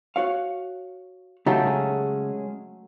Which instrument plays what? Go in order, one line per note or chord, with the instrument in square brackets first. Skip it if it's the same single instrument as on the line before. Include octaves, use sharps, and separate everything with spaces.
[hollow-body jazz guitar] F#4 C#5 F5
[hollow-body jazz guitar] C#3 G4 A#5 [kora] F#3 A3 A4 [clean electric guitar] D#4
[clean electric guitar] G#3 C#4 G#4